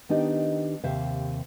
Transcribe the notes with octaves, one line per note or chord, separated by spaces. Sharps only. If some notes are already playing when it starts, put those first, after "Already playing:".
D#3 B3 D4 D#4 G4 D#5
D#2 C3 C5 E5 F5